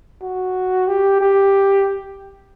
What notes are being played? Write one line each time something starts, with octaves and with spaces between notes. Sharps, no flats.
F#4
G4
G4